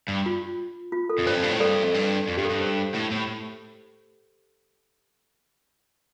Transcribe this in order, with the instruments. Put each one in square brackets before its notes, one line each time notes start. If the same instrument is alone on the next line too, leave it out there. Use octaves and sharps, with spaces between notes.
[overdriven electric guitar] G2
[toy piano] F4
F4
A4
[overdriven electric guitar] F2
[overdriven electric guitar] G2 [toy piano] C5
[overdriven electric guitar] F2
G2
A2
[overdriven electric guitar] G2 [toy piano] A4 D5
[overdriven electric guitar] F2
G2
F2
[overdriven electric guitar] G2 [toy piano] G4
[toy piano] A4
[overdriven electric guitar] G2
[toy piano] C5
[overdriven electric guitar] A2
A2